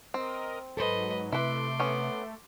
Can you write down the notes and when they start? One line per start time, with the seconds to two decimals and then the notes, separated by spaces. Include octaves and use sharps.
0.14 C4 A#4 D#5
0.77 G#2 F#3 A4 B4 C5 D#5
1.32 C3 A3 E4 B4 C6 D6
1.80 B3 C#4